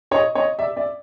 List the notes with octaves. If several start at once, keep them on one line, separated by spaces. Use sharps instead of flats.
C#5 D#5
C#5 D#5
D5 E5
D5 E5